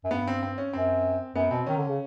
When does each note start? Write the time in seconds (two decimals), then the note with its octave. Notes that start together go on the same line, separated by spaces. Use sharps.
0.04 F#2
0.11 G2 B3
0.27 C4
0.43 C4
0.58 C#4
0.73 F#2 C4
1.35 F#2 B3
1.51 B2 C4
1.66 D#3 C#4
1.78 D3
1.88 C#3